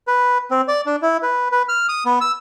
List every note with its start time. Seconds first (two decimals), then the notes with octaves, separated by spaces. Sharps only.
0.07 B4
0.51 C4
0.68 D5
0.86 D4
1.02 E4
1.23 B4
1.52 B4
1.69 F6
1.89 D#6
2.05 B3
2.21 E6